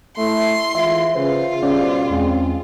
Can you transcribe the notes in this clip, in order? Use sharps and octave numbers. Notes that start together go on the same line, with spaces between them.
A3 E4 C6
E3 G#3 F4 E5
C#3 F4 B4 C5
B2 G3 C#4 G#4 C5 D5
E2 G#3 C4